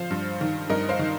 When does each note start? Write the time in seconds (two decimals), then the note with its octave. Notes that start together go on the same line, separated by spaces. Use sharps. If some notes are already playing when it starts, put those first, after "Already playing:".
Already playing: F3 C5 F5
0.11 G2
0.41 D#3
0.70 G2 A#4 D#5
0.89 C5 F5
0.99 D#3